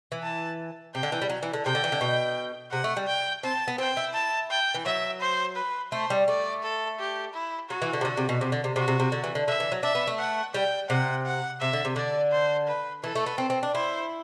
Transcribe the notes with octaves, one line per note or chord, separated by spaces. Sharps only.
E3
A5
C3 G5
D3
E3
G3
F#3
E3
D3
C3 G5
D3
E3
D3
B2
C3 F#5
A3
G3
G5
C4 A5
B3
C4 G5
E4
A5
G5
E3
F#3 E5
C5
B4
A3 C5
G3
A3 D5
A4
G4
E4
F#3 F#4
E3
D3
C3
D3
C3
B2
C3
D3
C3
C3 F#4
C3
C3
D3
E3
D3
D3 E5
E3
F#3
D4 E5
B3
A3
F#5
G3 G5
C3 F#5
F#5
C3 E5
D3
C3
D3 D5
C5
B4
E3 A4
A3
B3
C4
C4
D4
E4 C5